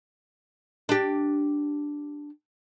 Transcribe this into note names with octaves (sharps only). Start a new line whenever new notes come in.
D4 G4